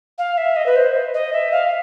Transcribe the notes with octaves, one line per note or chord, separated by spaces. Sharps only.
F5
E5
D#5
B4
C5
D#5
E5
F5